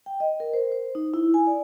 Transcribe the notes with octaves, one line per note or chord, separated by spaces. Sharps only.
G5
D#5
A#4
C5
C5
D#4
E4
G#5
D5